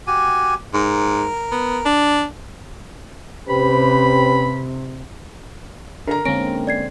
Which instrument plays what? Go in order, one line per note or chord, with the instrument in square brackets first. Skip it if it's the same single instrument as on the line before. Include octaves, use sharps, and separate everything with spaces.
[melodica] F#4 G4 G#5
[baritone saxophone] G#2 [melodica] A#4
[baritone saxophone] B3
D4
[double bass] C3 [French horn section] C#4 G4 C5 [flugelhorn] B4 [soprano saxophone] B5
[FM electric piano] D3 [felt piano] A#4 A#5
[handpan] D3 G#3 C4 [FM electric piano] A#3 C#4 [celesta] A#6 D7
[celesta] D5 G#6 C7